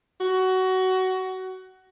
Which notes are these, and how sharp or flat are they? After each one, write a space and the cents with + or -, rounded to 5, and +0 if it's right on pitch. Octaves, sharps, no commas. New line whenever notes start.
F#4 +20